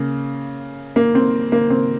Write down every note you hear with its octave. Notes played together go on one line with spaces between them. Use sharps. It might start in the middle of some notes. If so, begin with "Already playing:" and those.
Already playing: C#3 A#3
A#3
C4
A#3
C4